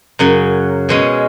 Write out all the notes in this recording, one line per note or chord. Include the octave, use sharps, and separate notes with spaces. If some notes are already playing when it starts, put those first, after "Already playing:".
F#2 C#3 F#3
B2 G#3 C#4